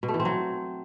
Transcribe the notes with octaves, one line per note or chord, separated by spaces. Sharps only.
B2
A3
E3
C4
F#3